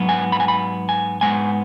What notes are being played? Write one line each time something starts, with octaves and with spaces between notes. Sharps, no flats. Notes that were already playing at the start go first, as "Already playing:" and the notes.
Already playing: G#2 F#3 B3
G#5
B5
G#5
B5
G#5
G#2 G#3 B3 G#5